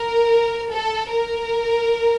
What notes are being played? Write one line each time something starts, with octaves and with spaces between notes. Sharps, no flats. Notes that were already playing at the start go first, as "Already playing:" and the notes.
Already playing: A#4
A4
A#4